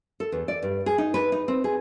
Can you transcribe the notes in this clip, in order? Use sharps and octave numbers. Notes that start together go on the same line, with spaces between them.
A4
E2
D5
G2
G#4
D#4
B4
D#4
C4
G#4